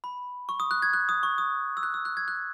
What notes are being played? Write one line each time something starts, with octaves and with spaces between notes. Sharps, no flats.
B5
C#6
D#6
F#6
G#6
F#6
D#6
C#6
D#6
E6
F#6
E6
F#6
G#6
F#6